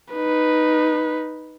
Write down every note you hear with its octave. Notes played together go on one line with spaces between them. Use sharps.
D#4 B4